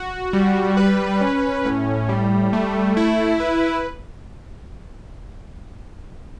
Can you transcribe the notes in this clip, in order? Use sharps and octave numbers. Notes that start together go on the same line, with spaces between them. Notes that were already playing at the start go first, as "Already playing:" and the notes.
Already playing: F#4
G3
B4
C#4
A2
G3
A3
E4
B4